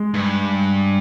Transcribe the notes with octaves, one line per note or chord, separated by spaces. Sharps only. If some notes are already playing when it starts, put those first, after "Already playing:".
Already playing: G#3
G2